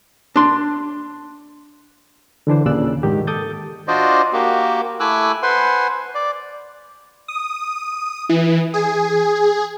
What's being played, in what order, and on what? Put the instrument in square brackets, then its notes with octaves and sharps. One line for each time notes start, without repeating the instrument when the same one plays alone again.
[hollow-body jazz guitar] D4 C6
[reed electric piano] D3 E3 D4 C5
D#2 A#2 C#3 D5 E6 F#6
G#2 D#3 G4
A4 D6 D#6 G6 A6
[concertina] D4 F4 F#4 C5 D5 D#5
A#3 F#4 G4
A3 E4 G#5 D6 E6 F#6
B4 C5 F#5 G#5 C6
D5
[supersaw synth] D#6
E3
G#4